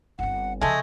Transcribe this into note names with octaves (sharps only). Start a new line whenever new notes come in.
G1 C4 F#5
C#3 F3 G#3 A3 A4 D#5 G#5